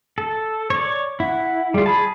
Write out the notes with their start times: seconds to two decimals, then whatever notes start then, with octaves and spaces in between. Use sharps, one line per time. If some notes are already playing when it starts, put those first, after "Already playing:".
0.18 A4
0.70 C#5 D5
1.20 E4 F#5
1.74 G3 F4 G#4
1.86 G#4 A5 B5